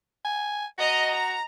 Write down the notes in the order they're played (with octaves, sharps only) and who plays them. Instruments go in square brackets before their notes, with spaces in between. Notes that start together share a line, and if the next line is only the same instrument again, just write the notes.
[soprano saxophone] G#5
[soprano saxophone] F#4 [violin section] D#5 A#5
[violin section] A#5